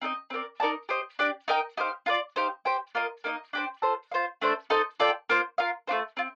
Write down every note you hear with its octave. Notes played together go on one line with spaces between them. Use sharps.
C4 D#4 A4 D#5
C4 G4 A#4 D5
D#4 A#4 D5 A5
G4 C5 D#5
D4 G4 D5
D#4 A#4 D#5 G5
D#4 G4 C5 F5
F4 A#4 D5
D#4 G4 C5 F5
G4 C5 G5
A#3 F4 A#4 D#5
A#3 D#4 A4 D#5
D4 G4 C5
F4 A4 C5
F4 C5 F5
A3 D4 A4 C5
D#4 A4 C5 D#5
F4 A4 D5 G5
A#3 F4 C5
F4 A#4 F5
A3 D4 F4 C5
C4 F4